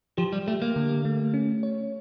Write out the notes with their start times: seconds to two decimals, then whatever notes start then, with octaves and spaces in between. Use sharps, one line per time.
0.18 F3 G4
0.33 G3
0.47 A3 G4
0.62 A#3
0.76 D3
1.05 A3
1.34 C#4
1.63 C#5